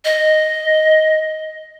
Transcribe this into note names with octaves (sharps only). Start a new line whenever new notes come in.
D#5